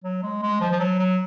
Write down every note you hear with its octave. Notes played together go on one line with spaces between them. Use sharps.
F#3
G#3
G#3
F3
F3
F#3
F#3